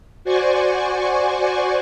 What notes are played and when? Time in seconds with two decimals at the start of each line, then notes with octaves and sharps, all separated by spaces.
0.24 F#4 C5 D5 G#5 C#6